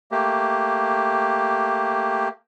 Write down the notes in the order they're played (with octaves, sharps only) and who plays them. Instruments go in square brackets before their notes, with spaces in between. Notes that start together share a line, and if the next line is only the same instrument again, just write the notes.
[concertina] A3 A#3 G4